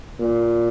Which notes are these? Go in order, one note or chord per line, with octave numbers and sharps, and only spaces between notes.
A#2